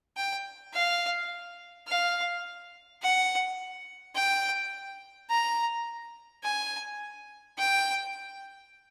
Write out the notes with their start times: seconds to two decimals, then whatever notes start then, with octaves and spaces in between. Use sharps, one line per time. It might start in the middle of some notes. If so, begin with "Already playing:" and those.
0.17 G5
0.74 F5
1.88 F5
3.02 F#5
4.15 G5
5.30 A#5
6.44 G#5
7.58 G5